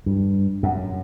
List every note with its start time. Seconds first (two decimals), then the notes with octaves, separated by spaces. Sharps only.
0.06 G2
0.63 F#2